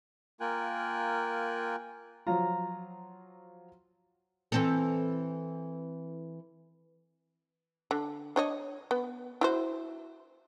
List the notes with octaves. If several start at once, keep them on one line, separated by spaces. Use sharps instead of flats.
A#3 F4 A#4 G5 G#5 F#6
F3 F#3 F4 A#5
E3 C4 A4
D3
D4 C#5 D#5
B3
E4 F#4 C5